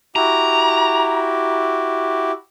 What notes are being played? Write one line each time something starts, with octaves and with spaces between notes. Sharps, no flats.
E4 F#4 G4 A#5